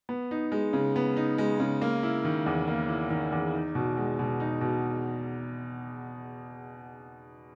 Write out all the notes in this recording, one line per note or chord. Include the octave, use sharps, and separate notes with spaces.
B3
D#4
G#3
C#3
B3
D#4
G#3
C#3
A#3
E4
D#3
E2
A#3
E4
D#3
E2
D#4
B2
G#3
B2
D#4
B2